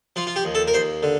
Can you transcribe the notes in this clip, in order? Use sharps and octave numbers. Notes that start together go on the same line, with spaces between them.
F3 F4
F4
G4
D#2
A4
A#4
D#2 C5
D3